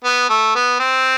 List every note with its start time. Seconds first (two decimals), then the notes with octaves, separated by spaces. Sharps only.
0.04 B3
0.29 A3
0.55 B3
0.79 C4